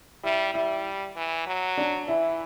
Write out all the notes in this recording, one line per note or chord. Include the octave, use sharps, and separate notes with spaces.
G3 E4
G3 E4
E3
F#3
D4
E3 E4